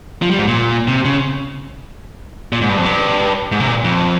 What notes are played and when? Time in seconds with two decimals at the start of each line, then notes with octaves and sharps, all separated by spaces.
0.22 F3
0.31 G3
0.39 G#2
0.47 A#2
0.88 C3
1.05 C#3
2.52 A#2
2.61 G#2
2.69 G2
2.78 F2
2.85 G2
3.52 G#2
3.60 C3
3.68 A#2
3.84 F2